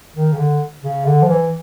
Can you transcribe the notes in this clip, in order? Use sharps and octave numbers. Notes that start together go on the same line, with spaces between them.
D#3
C#3
D3
C#3
D3
F3
E3